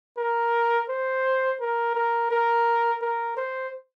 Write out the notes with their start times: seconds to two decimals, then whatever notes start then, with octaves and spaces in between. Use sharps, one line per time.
0.18 A#4
0.89 C5
1.60 A#4
1.95 A#4
2.31 A#4
3.01 A#4
3.37 C5